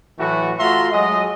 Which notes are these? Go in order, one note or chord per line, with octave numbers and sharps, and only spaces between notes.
A2 E3 F#3 A3 F#4
A3 F4 F#4 E5 A#5 C6
F#3 G#3 G#4 D#5